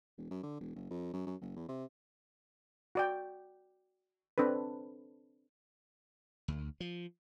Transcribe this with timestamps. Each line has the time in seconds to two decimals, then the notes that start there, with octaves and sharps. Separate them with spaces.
0.18 E1
0.31 F#2
0.43 D3
0.60 E1
0.76 F#1
0.90 F2
1.13 F#2
1.26 F#2
1.41 F#1
1.56 E2
1.69 C3
2.95 F#4 D5 G5
4.38 C4 D4 A4 B4
6.48 D2
6.80 F3